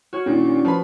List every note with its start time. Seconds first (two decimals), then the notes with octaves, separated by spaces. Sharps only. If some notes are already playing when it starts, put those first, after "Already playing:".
0.13 F#4 C#5 F6
0.26 A#2 D#3 C#4 D4 E4
0.65 F3 B4 B5